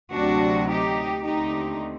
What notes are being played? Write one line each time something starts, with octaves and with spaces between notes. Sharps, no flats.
D2 C3 F#3 D4 F#4
D#4 G4
D#2 D3 A3 C4 D#4 G4